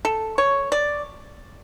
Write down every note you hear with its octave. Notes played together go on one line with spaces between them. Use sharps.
A4
C#5
D5